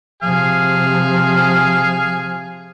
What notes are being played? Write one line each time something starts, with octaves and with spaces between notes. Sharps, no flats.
C3 F3 G#4 F5